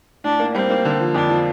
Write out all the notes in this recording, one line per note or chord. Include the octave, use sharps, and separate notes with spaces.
A2 D4
A#3
G3 C4
A#3
D3
F3
F2 D4
F3